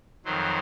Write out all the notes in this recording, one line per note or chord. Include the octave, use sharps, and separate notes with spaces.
F2 D#3 F#3 C5